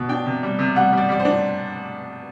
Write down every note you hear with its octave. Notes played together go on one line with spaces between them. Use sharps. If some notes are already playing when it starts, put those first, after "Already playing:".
Already playing: B2
D4 G5
C3
G3
C3
G3 F#5
G3
D5
G3 D5
C5
D4